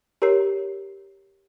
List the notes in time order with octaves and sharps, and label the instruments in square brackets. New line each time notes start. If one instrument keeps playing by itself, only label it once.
[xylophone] G4 A#4 C#5 A#5 C7